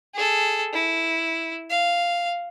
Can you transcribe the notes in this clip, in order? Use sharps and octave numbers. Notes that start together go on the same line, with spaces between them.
G#4 A4
E4
F5